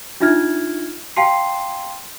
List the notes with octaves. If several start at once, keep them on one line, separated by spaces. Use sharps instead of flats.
D4 D#4 F4 E5 F6 G#6
F5 G5 A5 C6 C7